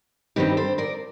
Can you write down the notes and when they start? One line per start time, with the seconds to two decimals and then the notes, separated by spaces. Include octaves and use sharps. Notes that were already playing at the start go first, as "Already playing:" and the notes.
0.36 G2 D#3 G3 C4 D#4 G4
0.57 A4 C5
0.78 A#4 D5